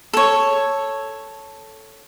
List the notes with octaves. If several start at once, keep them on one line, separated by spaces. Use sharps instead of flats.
A4 C#5